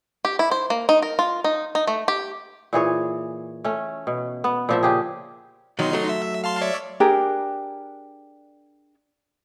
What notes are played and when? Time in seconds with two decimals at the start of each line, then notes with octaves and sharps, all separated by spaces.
0.25 G4
0.39 E4
0.51 C5
0.70 A#3
0.89 D#4
1.02 A#4
1.19 F4
1.44 D#4
1.75 D#4
1.87 A3
2.08 G4
2.73 A#2 E3 G#4 C#5
3.64 A3 C#4
4.07 B2
4.44 B3
4.69 A#2 F3 E5
4.83 C#3 G4 G#4
5.79 B1 D#3 F#3 D#4 C6
5.93 F#3 A3
6.09 E5
6.44 F5 A5 C6
6.61 C#5 D5 E5
7.00 D4 G4 G#4 A#4